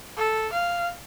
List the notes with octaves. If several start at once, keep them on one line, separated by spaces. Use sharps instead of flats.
A4
F5